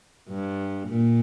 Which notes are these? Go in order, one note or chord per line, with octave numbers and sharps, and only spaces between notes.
G2
A#2